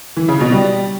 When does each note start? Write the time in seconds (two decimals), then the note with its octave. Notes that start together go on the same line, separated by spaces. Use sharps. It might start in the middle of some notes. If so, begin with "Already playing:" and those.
0.17 E3
0.28 C#3
0.40 B2
0.52 G3